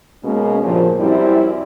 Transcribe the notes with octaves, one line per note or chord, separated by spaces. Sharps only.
B2 G#3 A#3 C#4
G2 A#2 C#3 F3
F#2 G3 C4 E4